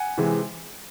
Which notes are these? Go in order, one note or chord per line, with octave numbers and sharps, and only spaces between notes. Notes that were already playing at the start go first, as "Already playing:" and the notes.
Already playing: F#5 G#5
C3 E3 G#3